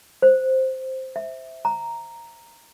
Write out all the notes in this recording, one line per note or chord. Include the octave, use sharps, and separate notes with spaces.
C5
E5
A#5